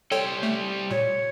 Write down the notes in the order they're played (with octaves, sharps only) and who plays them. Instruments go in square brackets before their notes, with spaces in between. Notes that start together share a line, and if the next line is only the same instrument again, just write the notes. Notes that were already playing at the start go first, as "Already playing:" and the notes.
[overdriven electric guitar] G3 C5 [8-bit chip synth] A4 C#5 G5
[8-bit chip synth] A3
[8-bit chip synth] A#2 [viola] C#5